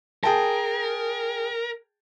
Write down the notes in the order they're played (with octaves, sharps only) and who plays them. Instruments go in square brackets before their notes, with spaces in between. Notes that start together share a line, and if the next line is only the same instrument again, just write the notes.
[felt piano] G#4 G5 A5 [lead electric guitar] A#4